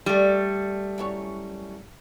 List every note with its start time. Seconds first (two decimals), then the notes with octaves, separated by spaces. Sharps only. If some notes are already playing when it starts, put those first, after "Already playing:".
0.06 G3 A3 D4
0.98 F#2 E4 C#5